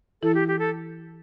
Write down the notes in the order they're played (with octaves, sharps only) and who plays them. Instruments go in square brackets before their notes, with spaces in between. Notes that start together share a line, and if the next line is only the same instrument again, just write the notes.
[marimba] E3 E4 [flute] A4
[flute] G4
G4
A4